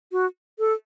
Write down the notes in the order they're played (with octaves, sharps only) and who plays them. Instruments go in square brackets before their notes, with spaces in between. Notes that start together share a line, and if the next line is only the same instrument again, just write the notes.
[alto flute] F#4
A4